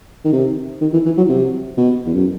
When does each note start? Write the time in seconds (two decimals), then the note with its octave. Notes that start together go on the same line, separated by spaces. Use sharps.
0.25 D#3
0.33 C3
0.81 D#3
0.93 E3
1.06 E3
1.17 F#3
1.29 C3
1.77 B2
2.06 E2
2.13 F#2